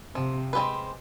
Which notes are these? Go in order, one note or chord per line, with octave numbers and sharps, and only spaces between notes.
C3 F3
G#3 C4 G4 B4